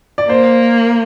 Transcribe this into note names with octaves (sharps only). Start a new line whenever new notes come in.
D5
A#3 C5